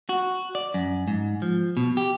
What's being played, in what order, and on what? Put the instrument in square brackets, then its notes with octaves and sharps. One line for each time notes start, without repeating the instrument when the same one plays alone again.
[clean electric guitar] F#4
D5
F#2
G#2
F3
B2
G4